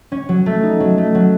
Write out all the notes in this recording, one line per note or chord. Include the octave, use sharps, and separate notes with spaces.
C#4
F#3
A3
D#4
F#3
A3
F#3